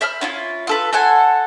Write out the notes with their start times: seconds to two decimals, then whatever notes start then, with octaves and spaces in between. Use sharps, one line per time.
0.01 C5 E5 B5 F6
0.21 C#4 E4 F4
0.67 F4 A4 B4
0.93 A4 C5 F#5 G#5